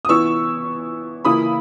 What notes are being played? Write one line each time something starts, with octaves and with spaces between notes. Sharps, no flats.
D#6
E3 B3 E4 C#6 E6
C#3 E3 A#3 E4 B5 D#6